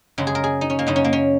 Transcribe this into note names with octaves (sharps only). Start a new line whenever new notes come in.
F#2 C#3 G#3
G#4
A#4
G#4
D#4
C#4
A#3
F#2 C#3 D#4
C#4
A#3
C#4